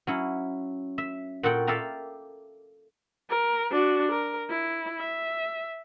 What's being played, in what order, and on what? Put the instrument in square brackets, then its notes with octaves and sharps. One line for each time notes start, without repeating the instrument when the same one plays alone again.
[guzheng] F#3 C#4 E4
E5
A#2 F#4 A4 F#5 G5
A4 D5 E5 F5 G5 A#5
[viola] A#4
D4 F#4
A#4
E4
E5